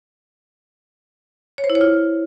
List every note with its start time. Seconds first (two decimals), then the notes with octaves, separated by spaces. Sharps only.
1.58 C#5
1.64 C5
1.70 E4
1.75 C#5
1.81 F4